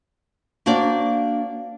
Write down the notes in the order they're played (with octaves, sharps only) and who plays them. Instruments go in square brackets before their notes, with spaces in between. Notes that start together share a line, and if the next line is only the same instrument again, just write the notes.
[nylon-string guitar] A#3 D4 F#4 C5 D5